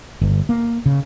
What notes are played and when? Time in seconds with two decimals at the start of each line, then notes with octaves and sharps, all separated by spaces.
0.21 G1
0.49 A#3
0.86 C#3